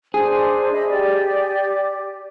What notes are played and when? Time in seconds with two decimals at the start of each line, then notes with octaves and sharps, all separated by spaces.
0.14 D4 G#4 C5
0.72 D#5 E5 B5
0.88 G4 D5